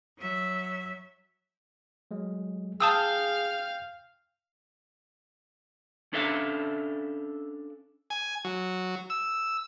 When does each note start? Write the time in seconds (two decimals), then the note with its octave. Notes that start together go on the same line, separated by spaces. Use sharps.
0.18 F#3 E5
2.11 F#3 G#3 A3
2.80 G#4 F5 G5 A5 D#6 E6 G6
6.13 C#4 D4 A4 E5 F5
8.10 G#5
8.45 F#3
9.10 E6